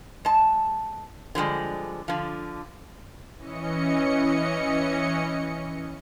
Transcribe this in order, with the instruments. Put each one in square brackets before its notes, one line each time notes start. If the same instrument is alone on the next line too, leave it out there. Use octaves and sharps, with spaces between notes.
[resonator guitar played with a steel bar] G#3 A5
D3 F3 G3 G#3
D3 F3
[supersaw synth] E3 C#4 D#5 C#7